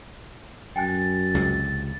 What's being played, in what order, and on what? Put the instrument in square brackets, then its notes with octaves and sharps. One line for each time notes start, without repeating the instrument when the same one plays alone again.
[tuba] F#2 [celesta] G5 G#5 F#6 [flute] A6
[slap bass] C#2 C3